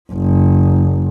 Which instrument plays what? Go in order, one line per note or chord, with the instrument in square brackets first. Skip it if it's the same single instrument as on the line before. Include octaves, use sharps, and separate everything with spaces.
[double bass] F#1